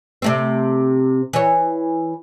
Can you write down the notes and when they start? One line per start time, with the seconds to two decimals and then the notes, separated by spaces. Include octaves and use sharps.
0.22 C3 A3 C4
1.33 E3 C#5